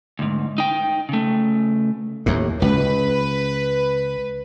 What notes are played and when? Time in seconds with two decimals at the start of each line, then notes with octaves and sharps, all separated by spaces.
0.19 D2 G#2
0.58 D#4 G5
1.09 C#3 A3
2.26 D#2 A2
2.62 C#2 B4